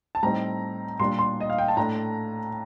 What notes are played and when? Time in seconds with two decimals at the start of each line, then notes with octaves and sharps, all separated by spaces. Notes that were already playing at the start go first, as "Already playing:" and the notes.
0.15 A5
0.23 A2 G3 C4 D#4 A#5
1.00 A#2 G3 D4 C6
1.19 C6
1.40 D#5
1.50 F5
1.58 G5
1.68 A5
1.77 A2 A3 D4 A#5